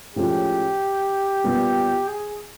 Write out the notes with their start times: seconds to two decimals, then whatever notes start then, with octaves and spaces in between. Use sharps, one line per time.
0.16 A2 F3 G#3 C#4 G4
1.44 A#2 G3 B3
2.08 G#4